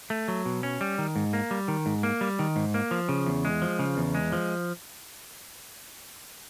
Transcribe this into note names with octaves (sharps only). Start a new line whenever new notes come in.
A3
F#3
B2
C#4
G3
D#3
G#2
A#3
G3
D#3
G#2
A#3
G3
D#3
G#2
A#3
F3
C#3
E2
G#3
F3
C#3
E2
G#3
F3